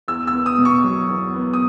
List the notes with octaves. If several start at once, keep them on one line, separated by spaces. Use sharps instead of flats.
E2 E6
E6
B3
D#6
B2
C#6
F#3
E2
B3
D#6